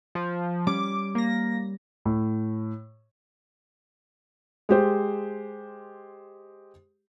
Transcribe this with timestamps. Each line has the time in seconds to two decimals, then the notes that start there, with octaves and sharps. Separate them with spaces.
0.15 F3
0.67 G3 C#4 D6
1.15 A#3 A#6
2.05 A2
4.69 G#3 G4 C5